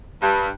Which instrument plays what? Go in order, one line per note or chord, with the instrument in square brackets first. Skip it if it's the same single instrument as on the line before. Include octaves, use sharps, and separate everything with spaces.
[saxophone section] G2